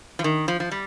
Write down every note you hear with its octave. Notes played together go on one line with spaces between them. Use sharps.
F3
D#3
F3
F3
G3